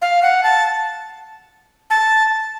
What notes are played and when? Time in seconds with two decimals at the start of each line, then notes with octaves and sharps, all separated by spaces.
0.02 F5
0.22 F#5
0.43 A5
1.90 A5